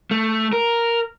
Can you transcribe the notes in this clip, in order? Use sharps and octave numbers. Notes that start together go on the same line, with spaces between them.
A3
A#4